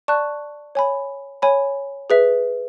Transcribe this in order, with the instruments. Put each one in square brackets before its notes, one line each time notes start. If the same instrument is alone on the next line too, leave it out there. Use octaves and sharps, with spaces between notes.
[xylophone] D5 A5 C#6 F#6
C#5 G#5 B5
C#5 G#5 B5
G#4 B4 E5